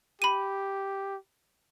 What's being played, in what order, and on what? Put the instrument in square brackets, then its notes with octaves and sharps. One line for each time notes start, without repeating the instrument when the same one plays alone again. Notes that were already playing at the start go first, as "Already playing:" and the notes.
[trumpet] G4 [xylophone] B5 D#7